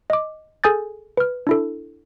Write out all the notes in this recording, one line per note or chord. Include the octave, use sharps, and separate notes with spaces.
D#5 D6
G#4 A4 G#5 D#6 G6 A6
B4 F6
D4 E4 A4